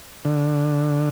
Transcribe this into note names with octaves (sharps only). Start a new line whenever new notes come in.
D3